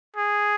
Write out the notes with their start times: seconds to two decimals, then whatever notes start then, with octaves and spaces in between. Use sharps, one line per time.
0.17 G#4